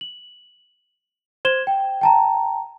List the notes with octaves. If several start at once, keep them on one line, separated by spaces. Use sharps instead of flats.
F#7
C5 C6 G#6 E7 G7
G5
G5 A5 A#5